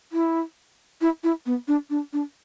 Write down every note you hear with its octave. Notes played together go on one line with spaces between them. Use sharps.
E4
E4
E4
B3
D4
D4
D4